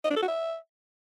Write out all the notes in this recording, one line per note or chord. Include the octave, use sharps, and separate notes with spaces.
D#5
D4
A4
F#4
E5